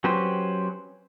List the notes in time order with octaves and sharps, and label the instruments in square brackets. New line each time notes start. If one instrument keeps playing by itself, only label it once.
[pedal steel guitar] F#3 C#4 G4 B4 C5